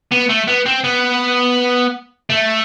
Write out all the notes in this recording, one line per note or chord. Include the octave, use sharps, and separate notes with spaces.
B3
A3
B3
C4
B3
A3